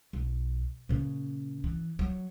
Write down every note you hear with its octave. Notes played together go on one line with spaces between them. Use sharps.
B1
A#2 C#3
E3
F#3